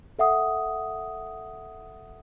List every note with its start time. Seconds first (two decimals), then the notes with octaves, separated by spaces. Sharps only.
0.19 A4 E5 F#5 D#6